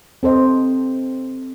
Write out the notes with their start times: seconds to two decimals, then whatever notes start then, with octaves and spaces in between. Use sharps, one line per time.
0.23 C4 A4 C5 D#5